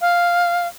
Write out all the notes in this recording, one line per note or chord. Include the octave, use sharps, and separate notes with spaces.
F5